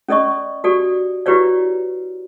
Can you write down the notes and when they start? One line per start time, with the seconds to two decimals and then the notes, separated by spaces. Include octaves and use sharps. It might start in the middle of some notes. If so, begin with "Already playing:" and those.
0.08 C#4 A4 D5 D#5 C#6
0.64 F#4 G4 A4 D5
1.26 E4 F#4 G4 B4 C#5 D5